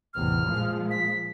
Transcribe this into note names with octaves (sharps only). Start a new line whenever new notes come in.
A1 E2 C3 F6
A#2 F3 G#3
B6